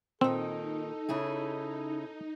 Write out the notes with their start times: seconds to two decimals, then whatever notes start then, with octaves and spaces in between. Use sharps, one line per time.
0.21 A#2 D#3 C4 D#4 A4
1.09 C#3 E4 G#4